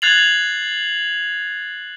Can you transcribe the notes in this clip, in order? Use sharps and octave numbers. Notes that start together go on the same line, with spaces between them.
F#6 G#6 A6 C7 F7 F#7